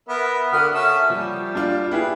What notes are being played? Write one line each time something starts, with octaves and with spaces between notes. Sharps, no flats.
B3 A#4 E5
D3 F#4 A#4 F#5 D#6 F6
C#4 A4 E5
F3 G3
D4 F4
E4 G4 G#4 B4